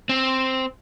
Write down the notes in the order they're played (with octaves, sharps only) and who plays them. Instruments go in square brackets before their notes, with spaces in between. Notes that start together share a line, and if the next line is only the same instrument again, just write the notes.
[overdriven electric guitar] C4